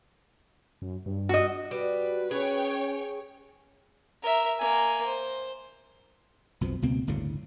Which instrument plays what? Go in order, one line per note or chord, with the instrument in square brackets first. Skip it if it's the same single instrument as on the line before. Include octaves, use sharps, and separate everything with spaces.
[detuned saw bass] F#2
G2
[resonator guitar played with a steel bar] F#4 D#5
[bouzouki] G3 [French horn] F#4 [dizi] B4
[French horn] C#4 [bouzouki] G#4 [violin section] C#5 G5
[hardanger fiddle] A#4 E5
A#3 G#5
C5
[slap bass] B1 F2 B2 F3
C#2 B2 A#3 C4
G1 D2 A2 C#3